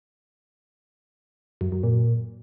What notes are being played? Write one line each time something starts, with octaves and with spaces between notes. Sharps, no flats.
F#2
F#2
A#2